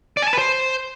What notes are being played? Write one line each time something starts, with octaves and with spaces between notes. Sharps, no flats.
D5
G#5
A5
B4
C5